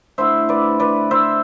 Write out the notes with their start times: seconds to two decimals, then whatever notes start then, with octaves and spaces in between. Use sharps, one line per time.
0.18 D3 A3 E4 C5 E5
0.49 B4 D5
0.80 B4 D5
1.11 C5 E5